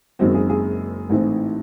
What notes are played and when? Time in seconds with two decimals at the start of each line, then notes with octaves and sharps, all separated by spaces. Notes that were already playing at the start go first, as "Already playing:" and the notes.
0.19 F#1 F#2 D#3 G#3 C4 F#4
0.35 G#4
0.49 G#4
1.10 A1 G#2 E3 A3 C4